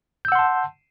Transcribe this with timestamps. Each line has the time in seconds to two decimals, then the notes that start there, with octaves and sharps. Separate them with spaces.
0.25 G6
0.28 E6
0.32 F#5
0.35 C6
0.39 A5